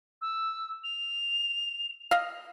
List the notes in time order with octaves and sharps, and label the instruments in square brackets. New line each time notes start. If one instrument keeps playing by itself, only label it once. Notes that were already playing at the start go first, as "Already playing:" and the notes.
[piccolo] E6
F7
[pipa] D#5 F5